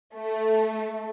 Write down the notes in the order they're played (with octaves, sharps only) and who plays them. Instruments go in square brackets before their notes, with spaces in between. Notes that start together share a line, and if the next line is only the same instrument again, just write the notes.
[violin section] A3